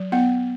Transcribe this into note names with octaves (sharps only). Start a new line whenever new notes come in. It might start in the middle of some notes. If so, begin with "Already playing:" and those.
Already playing: F#3
B3 F#5